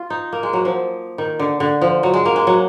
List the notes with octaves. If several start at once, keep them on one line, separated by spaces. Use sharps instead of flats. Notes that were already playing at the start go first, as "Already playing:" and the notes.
Already playing: F4
D#4
A#3
G#3
F#3
F3
D#3
D3
D3
F3
F#3
G#3
A#3
G#3
F#3